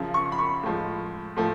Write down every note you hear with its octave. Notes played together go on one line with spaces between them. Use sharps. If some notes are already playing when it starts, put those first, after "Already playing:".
Already playing: F#2 C#3 F3
C#6
B5
C#6
A2 F3 G#3
A2 F3 A3